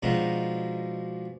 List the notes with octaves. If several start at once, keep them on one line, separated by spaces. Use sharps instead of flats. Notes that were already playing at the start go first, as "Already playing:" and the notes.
B2 F3 G#3 D4 D#4